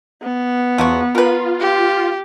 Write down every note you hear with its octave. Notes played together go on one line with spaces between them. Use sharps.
B3
E2 F3 F#3 F#4
F4 A#4 B4
G4